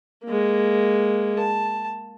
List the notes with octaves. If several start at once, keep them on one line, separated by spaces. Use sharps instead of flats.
G#3 A#3
A5